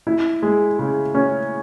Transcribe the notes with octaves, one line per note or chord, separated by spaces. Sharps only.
E4
G#3
C#3
C#4